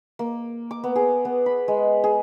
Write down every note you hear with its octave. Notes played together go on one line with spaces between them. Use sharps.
A#3
D6
B3
G#4
B3
B5
G#3
G#4